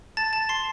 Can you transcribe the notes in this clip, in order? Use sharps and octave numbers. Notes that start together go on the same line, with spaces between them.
A5 A6
A5 A6
C6 C7